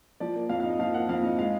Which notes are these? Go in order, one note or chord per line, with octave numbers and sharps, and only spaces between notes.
F3 D5
A#3
F2 F5
F5
D#4 D#5
F3 F5
A#3 F#5
F2 F5
D#4 D#5
G#3 F5